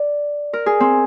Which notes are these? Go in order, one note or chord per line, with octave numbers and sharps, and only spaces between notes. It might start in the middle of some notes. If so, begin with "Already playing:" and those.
Already playing: D5
A#4
G#4
C4